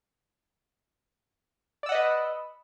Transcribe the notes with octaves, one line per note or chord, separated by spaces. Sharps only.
B4 D5 D#5 F#5 E6